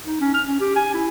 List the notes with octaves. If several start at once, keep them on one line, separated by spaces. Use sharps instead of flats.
D#4
C#4
F6
C#4
G4
G#5
E4